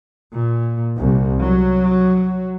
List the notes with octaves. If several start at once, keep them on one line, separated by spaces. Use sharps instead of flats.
A#2
C2
F#3